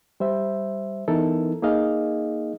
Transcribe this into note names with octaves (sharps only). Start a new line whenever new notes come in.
G3 C5 E5
E3 B3 D#4 E4 A4 A#4
A#3 D#4 G#4 D#5 F5